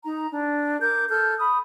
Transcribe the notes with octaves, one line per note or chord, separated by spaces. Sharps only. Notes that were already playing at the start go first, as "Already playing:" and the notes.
D#4 A#5
D4
A#4 D6 G6
A4 F6 G6
B5 D#6